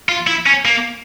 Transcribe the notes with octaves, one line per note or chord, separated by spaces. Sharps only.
F4
E4
C#4
A#3